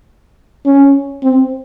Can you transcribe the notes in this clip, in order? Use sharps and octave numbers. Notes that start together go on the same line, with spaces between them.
C#4
C4